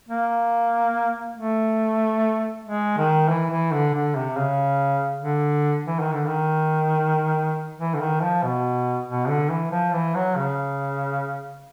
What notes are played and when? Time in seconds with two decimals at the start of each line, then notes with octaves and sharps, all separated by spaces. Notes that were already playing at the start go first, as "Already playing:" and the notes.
0.09 A#3
1.37 A3
2.64 G#3
2.98 D#3
3.29 E3
3.51 E3
3.72 D3
3.94 D3
4.15 C3
4.37 C#3
5.22 D3
5.86 E3
6.00 D#3
6.13 D3
6.27 D#3
7.79 E3
7.94 D3
8.00 D#3
8.22 F3
8.43 B2
9.07 B2
9.29 D3
9.50 E3
9.71 F3
9.93 E3
10.15 F#3
10.36 C#3